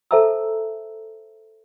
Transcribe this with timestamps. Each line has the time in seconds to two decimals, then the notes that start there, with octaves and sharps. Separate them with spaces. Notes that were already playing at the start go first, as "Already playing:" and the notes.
0.11 A4 C5 E5 A5 A#5 E6